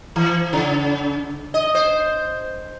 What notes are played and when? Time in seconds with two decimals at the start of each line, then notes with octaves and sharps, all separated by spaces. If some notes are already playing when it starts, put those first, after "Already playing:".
0.16 E3
0.53 C#3
1.54 D#5
1.75 C5